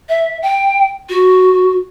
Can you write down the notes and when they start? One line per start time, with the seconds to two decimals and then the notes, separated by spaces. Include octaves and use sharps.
0.09 E5
0.42 G5
1.10 F#4